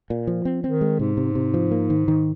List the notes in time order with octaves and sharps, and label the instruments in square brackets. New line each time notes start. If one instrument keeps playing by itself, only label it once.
[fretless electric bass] A#2
F3
C4
[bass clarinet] D#3 [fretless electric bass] C4
[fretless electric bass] G#3
[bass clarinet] G#2 [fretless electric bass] C3
[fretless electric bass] C3
C3
F3
A#3
D#3
D#3